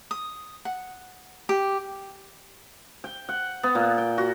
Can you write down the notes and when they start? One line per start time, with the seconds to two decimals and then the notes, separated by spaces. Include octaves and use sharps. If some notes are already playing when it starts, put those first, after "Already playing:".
0.11 D#6
0.65 F#5
1.49 G4
3.04 G5
3.29 F#5
3.63 B3
3.75 A#2
3.98 G5
4.18 F#4